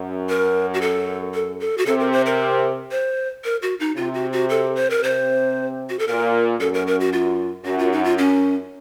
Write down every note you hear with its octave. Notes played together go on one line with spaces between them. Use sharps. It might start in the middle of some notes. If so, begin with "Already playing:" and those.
Already playing: F#2
A#4
F#4
A4
A4
A4
F#4
C3 A4
A#4
C5
A#4
C5
A#4
F#4
D#4
C3 F4
F#4
F#4
A4
C5
A#4
C3 C5
F#4
A4
A#2 A#4
F#2 A4
A#4
A#4
F#4
F4
F#2 F#4
F4
D#4
F4
C#4